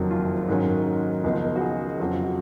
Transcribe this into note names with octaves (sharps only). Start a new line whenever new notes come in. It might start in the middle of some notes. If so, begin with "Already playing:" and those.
Already playing: F#1 F2 D#3 F#3
F4
G#2 D#3 F#3 C#4
C#2 C#3 F3 B3 D#4 A#4
F#4
G#4
F2 C#3 F#3 F#4
F4
F#4